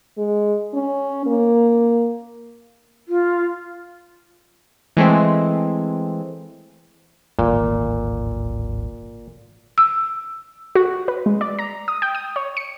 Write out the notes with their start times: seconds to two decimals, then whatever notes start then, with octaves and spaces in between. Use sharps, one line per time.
0.18 G#3
0.74 C#4
1.26 A#3
3.08 F4
4.97 E3 G#3 A3 C4
7.39 D1 G#1 A#2
9.78 E6
10.75 F#4
11.08 B4
11.26 G#3
11.41 D5
11.59 A#5
11.88 D#6
12.02 G5
12.15 D#6
12.36 C#5
12.57 C#7